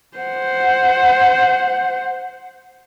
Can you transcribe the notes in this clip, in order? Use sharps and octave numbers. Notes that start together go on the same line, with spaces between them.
C5 F#5